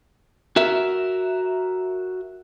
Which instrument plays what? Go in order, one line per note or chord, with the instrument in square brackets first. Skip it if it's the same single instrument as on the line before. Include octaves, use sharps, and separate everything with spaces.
[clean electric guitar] F#4 A#4 E5